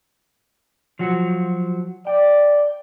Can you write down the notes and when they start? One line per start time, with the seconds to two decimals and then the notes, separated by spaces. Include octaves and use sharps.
0.99 F3 F#3 F#4
2.07 D5 G5